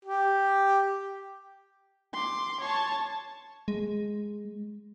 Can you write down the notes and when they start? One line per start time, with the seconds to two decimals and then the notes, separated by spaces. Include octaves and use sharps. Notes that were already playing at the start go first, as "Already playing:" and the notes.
0.05 G4
2.13 C6 D6
2.61 C#5 A5
3.68 G#3